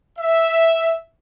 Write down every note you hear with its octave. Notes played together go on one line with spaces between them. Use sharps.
E5